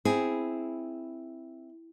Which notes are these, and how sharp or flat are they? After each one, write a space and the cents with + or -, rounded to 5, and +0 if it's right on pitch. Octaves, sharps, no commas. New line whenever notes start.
C4 +0 E4 +0 G#4 +0